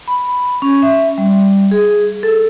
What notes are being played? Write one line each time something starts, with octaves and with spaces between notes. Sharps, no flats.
B5
C#4
E5
G3
G#4
A4